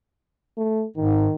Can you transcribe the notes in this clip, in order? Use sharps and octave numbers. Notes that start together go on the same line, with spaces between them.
A3
G#2 D#3